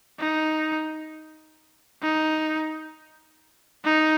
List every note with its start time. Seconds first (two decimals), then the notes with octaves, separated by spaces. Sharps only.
0.19 D#4
2.03 D#4
3.85 D#4